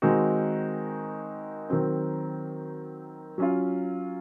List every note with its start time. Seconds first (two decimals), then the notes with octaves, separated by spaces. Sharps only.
0.02 D#3 G#3 C4 D#4 F#4
1.70 D#3 F#3 C4
3.38 F#3 C#4 F4